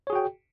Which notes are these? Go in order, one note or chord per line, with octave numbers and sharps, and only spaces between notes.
F#4 G#4 C#5 G5